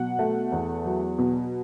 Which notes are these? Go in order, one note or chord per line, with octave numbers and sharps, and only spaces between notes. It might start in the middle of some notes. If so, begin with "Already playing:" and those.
Already playing: B2 F#3 F#5
A3
E2
F#3
B2